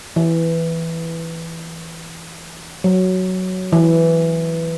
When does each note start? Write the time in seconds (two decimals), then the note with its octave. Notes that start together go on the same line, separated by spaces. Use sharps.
0.16 E3
2.84 F#3
3.72 E3